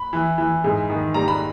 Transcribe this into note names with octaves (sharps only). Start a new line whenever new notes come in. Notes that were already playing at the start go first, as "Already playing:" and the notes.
Already playing: B5
E3
E3
G#2
D#3
G3 A#5
B5